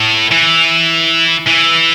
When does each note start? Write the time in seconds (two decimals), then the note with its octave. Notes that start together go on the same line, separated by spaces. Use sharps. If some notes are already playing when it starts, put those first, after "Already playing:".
Already playing: A2
0.32 E3
1.47 E3